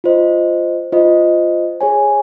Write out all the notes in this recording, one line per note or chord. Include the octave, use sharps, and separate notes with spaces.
F4 C5 D#5
F4 C5 D#5
G#4 C#5 G#5